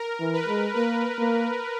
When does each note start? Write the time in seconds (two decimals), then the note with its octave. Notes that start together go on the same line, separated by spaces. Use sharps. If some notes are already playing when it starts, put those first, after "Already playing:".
Already playing: A#4
0.20 E3
0.34 B4
0.48 G#3
0.76 A#3 B4
1.19 A#3